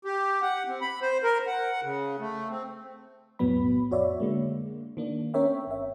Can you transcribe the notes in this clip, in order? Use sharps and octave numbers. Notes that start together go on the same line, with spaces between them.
G4
F#5
C4
B5
C5
A#4
F#5
C#3
A3
C4
B1 F2 A2 F#3 B3 B5
F2 F#4 C#5 D5 E5
D3 G#3 A#3
D#3 A#3 D4
C4 C#4 A#4 C#5 E5 G5
G1 E5